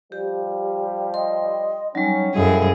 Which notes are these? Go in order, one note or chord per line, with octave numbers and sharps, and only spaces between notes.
F3 G3 G4
D#5 C6
F#3 G3 C#4 D#4
F#2 F3 G#3 E4 G#4 A4